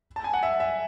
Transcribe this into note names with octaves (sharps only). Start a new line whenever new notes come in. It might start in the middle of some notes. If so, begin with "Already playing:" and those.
A5
G#5
F#5
E5
E5